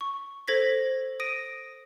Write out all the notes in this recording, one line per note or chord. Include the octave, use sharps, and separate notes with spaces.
C#6
A4 C5 G#6 A#6 B6
D#6 A#6 D7 D#7